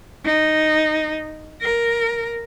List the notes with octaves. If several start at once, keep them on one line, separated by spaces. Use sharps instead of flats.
D#4
A#4